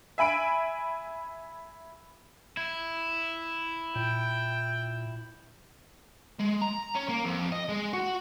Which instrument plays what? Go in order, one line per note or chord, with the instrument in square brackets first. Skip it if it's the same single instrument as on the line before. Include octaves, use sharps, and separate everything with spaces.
[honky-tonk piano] E5 G#5 B5 D7
[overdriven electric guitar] E4
[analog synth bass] A#2 [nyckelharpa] G5
[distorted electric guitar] G#3
A#5
C#4
A#3
F2
D#5
G#3
F#4